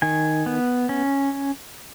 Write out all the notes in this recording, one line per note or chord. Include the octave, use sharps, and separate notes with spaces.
D#3 G#5
B3
C#4